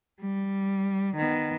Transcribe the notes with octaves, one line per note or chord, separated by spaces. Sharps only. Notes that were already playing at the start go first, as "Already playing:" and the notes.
G3
D#3 B3